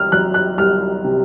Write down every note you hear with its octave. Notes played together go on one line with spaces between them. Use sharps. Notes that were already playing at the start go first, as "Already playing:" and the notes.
Already playing: C2 F6
F#3 F#6
F#6
C2 F6
C3